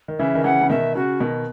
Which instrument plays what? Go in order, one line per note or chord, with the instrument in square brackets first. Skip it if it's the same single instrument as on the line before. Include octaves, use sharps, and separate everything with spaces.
[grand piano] D#3
[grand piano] C#3 E3 [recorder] E5
[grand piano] D#3
[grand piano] C#3 E3 [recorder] F#5
[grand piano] C#3
[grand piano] B2 D#3 [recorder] E5
[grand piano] C#3 [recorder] F#4
[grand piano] B2 D#3